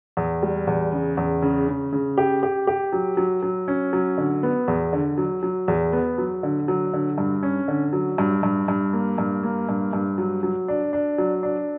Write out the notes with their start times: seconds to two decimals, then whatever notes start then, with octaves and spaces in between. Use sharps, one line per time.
0.17 E2
0.43 G3
0.67 E2
0.92 C#3
1.17 E2
1.42 C#3
1.68 C#3
1.92 C#3
2.18 G4
2.43 G4
2.67 G4
2.93 F#3
3.17 F#3
3.43 F#3
3.68 C#4
3.93 F#3
4.18 D3
4.43 B3
4.68 E2
4.93 D3
5.18 F#3
5.43 F#3
5.68 E2
5.93 B3
6.18 F#3
6.43 D3
6.68 F#3
6.93 D3
7.18 G2
7.43 C#4
7.68 D3
7.93 F#3
8.18 G2
8.43 G2
8.68 G2
8.93 A#3
9.18 G2
9.43 A#3
9.69 G2
9.93 G2
10.18 F#3
10.43 F#3
10.68 D4
10.93 D4
11.18 F#3
11.43 D4